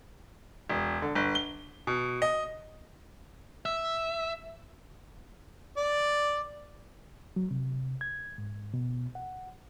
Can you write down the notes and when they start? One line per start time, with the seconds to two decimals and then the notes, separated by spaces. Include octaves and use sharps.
0.69 E1
1.02 D3
1.15 G1
1.35 G7
1.87 B2
2.22 D#5
3.65 E5
5.77 D5
7.36 F#3
7.51 C3
8.01 G#6
8.38 G#2
8.74 B2
9.15 F#5